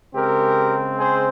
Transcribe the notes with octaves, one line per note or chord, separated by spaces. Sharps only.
C#3 G#3 C4 G4 A#4
G#4 C5